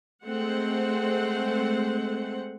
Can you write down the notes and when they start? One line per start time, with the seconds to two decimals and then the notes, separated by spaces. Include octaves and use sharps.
0.24 G#3 A3 C4 C5 F#5